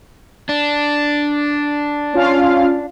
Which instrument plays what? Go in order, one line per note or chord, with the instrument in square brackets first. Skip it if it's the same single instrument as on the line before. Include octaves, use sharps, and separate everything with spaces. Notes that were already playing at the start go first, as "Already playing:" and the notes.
[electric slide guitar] D4
[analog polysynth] C#4 F4 F5